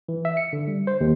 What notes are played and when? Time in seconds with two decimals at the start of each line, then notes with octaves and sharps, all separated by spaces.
0.09 E3
0.25 E5
0.37 C#7
0.53 D3
0.68 G3
0.87 C5
1.01 D#2